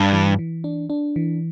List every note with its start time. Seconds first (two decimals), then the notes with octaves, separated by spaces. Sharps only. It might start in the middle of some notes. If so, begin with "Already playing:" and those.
Already playing: G2 D4
0.13 E3
0.39 E3
0.64 D4
0.90 D4
1.16 E3